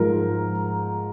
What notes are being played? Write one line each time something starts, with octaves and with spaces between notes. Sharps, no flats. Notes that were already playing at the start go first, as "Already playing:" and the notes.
Already playing: G#2 F3 A#4